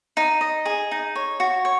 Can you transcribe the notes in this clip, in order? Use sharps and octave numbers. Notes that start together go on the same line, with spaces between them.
D#4
D#5
G#4
D#4
C#5
F#4
C#5